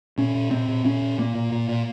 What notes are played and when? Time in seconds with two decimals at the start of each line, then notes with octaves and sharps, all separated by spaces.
0.18 A#2 C#4
0.35 A#2
0.51 A#2 C4
0.68 A#2
0.85 A#2 C#4
1.02 A#2
1.18 A#2 A#3
1.35 A#2
1.52 A#2
1.69 A#2